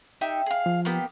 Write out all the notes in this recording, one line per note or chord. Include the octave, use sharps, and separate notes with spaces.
D#4 G4 E5
G#4 F5
F3
A#3 B3 G4